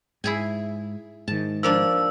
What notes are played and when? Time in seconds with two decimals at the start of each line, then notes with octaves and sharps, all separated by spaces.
0.24 G#2 E4 G#4 G#5
1.28 G#2 D#3 A5
1.63 F3 A#3 D4 E6